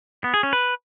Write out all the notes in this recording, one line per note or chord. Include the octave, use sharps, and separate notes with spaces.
B3
G#4
C#4
B4